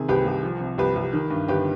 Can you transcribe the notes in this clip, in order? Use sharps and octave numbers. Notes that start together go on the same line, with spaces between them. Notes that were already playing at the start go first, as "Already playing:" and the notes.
Already playing: C3 D#3 G#4
C2 G4 B4
C2
F3
C3
C2 G4 B4
C2
D#3
G2
G1 G4 B4